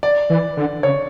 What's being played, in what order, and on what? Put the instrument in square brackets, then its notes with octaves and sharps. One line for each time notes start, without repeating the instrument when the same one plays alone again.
[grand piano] D5
[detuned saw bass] E3
D3
[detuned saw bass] C#3 [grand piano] C#5